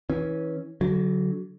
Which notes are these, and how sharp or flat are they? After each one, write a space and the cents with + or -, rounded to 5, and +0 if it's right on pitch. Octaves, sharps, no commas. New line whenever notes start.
E3 -25 C#4 -5
D3 -30 F#3 +0